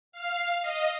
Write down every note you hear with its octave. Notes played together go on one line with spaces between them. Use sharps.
F5
D#5